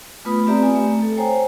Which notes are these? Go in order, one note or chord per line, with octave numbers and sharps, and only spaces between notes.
A3 B3 F4 B4 B5 D#6
C4 G4 D5 E5 A#5
G#5
A3 E5
A4
C5 C#5 G5 G#5 A#5